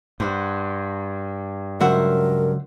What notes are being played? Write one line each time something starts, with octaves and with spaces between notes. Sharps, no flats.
G2 C5 F#5
C#2 F#3 A#4 C5 E5 F#5